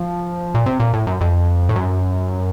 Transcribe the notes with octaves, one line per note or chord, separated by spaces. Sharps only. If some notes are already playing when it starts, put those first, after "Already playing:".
Already playing: F3
A#2
C3
A#2
A2
F#2
F2
A2
F#2